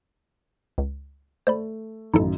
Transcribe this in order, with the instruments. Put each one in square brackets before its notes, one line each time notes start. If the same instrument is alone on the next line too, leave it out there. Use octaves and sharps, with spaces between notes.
[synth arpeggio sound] C#2
[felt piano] A3 [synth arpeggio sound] C5 D5 B5
[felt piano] A1 F#2 D#3 [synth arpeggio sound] D#4 E4 A4